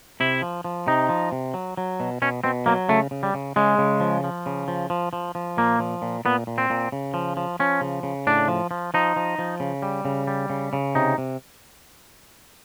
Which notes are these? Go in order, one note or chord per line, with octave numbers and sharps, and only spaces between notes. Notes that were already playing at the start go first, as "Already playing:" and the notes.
C3 E4
F3
F3
C3 D#4
F3
C3
F#3
F#3
B2
B2 C#4
B2 C4
F#3 A#3
C#3 A3
C#3
G3
C#3
C#3 G#3
C#3
F3
F3
C#3
F3
F3
F3
F3
A#2 A#3
F3
A#2
A#2 B3
A#2
C4
A#2
C#3
F3
F3
F3 C#4
C#3
C#3
A2 D4
F3
F3
F3 D#4
F3
F3
C#3
G3
C#3
G3
C#3
C#3
C3 D#4
C3